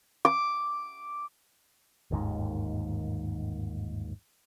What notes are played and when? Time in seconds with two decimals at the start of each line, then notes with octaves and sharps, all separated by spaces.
0.25 D6
2.11 G1 D#2 G#2 D#3